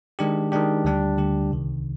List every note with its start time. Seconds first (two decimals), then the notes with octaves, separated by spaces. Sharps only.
0.19 D#3 G#3 D4 G4
0.52 D#3 G#3 D4 G4
0.85 D2 D3 G3 D4 G4
1.17 D2 D3 G3 D4 G4
1.51 C2 C3 D#3